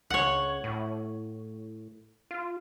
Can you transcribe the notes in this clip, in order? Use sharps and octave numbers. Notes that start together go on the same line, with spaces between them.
C#2 C#5 F#5
A2
F4